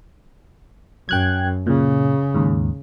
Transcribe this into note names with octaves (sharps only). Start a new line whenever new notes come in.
F#2 G5 F#6 G#6
A#2 C#3
D#2 G#2